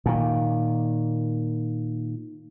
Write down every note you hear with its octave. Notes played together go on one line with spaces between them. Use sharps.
A#2 D#3